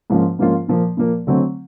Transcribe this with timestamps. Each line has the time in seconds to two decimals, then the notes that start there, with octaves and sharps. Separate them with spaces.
0.10 G#2 F3 A#3 C#4 F4
0.39 G#2 F3 A#3 C#4 F4
0.68 A#2 F3 A#3
0.97 A#2 F3 A#3
1.27 D3 F#3 A3 C4